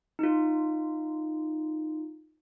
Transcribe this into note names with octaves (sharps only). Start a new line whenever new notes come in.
D#4 F4